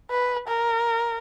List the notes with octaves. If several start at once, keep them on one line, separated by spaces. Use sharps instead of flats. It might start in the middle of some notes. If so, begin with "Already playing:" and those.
B4
A#4